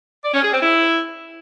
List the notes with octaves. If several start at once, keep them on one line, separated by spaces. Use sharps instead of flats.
D5
C#4
G#4
C4
E4